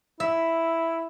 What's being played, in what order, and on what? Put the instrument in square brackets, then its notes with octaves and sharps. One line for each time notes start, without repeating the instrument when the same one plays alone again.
[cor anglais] E4 [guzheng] E5